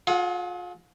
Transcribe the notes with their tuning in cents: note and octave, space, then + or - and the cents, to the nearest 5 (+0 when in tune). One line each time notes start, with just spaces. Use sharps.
F4 +35 G#4 +45 F#5 -5